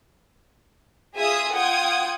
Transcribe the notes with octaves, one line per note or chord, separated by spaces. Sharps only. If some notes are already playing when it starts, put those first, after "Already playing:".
F4 G#4 E5 G#5 D#6
F4 F#5 G5 D#6 G#6